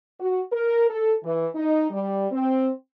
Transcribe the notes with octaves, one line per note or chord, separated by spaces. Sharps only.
F#4
A#4
A4
E3
D#4
G3
C4